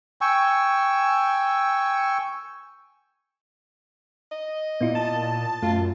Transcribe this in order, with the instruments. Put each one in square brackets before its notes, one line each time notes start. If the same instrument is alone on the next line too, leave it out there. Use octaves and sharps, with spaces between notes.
[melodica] G5 G#5 C#6 E6
[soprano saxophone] D#5
[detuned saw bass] A#2 [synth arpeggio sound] B3 E4 F4
[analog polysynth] A5
[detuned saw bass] F#2 [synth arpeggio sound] A3 [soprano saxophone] F4